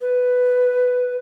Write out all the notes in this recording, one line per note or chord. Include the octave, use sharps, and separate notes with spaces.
B4